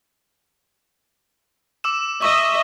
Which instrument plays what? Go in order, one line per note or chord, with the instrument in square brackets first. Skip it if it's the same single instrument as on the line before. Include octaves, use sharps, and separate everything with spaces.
[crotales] D6 E6 E7
[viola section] D#5 E5 [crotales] C#6